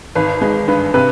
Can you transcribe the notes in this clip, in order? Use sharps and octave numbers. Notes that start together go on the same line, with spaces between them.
G#1 B4
G#3 B4
G2 B4
C3 B4